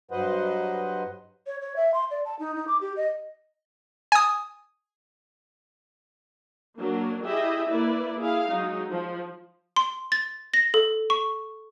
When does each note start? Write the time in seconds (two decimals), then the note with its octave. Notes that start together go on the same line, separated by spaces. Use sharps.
0.11 G2 F#3 B4 C5 D#5 F#5
1.47 C#5
1.61 C#5
1.76 E5
1.94 C6
2.11 D5
2.25 A5
2.39 D#4
2.56 D#4
2.68 D6
2.81 G4
2.97 D#5
4.12 G#5 D#6
6.77 F#3 A#3 D4 A#4
7.25 E4 G4 G#4 D#5 E5
7.68 A#3 E4 B4 D5
8.21 E4 G#4 F5
8.49 F#3 G#3 D#4
8.92 F3
9.76 C6
10.12 A6
10.54 A#6
10.74 A4
11.10 C#6